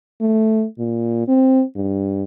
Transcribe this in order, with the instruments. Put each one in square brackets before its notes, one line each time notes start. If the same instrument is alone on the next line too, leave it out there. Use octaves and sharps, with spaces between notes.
[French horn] A3
A#2
C4
G2